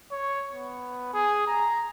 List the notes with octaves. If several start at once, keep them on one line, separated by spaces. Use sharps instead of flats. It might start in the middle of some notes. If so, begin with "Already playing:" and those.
C#5
B3
G#4
A#5